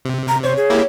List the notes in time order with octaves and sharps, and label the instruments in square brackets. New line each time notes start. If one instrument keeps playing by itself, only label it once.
[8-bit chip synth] C3
[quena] A#5
[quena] C5 [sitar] C#5
[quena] G#4
[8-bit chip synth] A#3 E4 G4